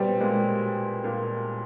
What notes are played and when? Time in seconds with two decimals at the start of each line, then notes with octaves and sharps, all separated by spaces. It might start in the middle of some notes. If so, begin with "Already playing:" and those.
Already playing: A#2 G3 B3 C4
0.20 A#2 G#3
1.04 A#2